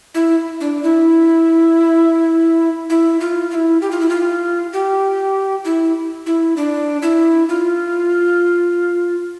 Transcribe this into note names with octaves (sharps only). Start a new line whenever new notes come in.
E4
D4
E4
E4
F4
F4
E4
G4
F4
E4
F4
G4
E4
E4
D4
E4
F4